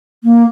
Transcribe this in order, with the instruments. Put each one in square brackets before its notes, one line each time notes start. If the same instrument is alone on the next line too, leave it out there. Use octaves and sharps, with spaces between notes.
[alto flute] A#3